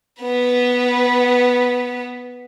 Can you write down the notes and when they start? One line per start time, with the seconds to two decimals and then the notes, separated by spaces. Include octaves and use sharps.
0.22 B3 B4